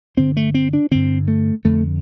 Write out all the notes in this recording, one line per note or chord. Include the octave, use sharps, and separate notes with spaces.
G2 D3 C4
A3
C4
D4
G2 D3 C4
A3
F2 D3 A3